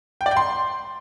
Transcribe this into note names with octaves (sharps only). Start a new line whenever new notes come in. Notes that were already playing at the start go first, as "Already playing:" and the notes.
G5
D5
G5
C6